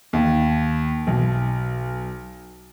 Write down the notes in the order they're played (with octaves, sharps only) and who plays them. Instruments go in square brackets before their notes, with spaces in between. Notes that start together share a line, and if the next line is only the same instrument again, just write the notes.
[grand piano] D#2
B1